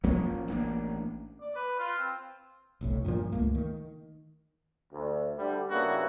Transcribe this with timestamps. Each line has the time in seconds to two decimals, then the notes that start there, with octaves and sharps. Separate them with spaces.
0.04 F3 A#3 C#4
0.48 A1 A#3 D4
1.41 D5
1.55 B4
1.79 F4
1.98 C4
2.81 F1 B1 A2
3.05 G2 A#2 D3 F3
3.32 C#2 A3 A#3
3.54 D#3
4.93 D2
5.38 D3 G3
5.70 G2 C#3 A#3 B3 E4 F#4